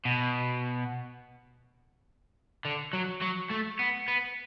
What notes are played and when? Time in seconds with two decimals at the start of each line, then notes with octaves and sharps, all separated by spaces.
0.05 B2
2.65 D3
2.93 F#3
3.22 F#3
3.51 A3
3.79 B3
4.08 B3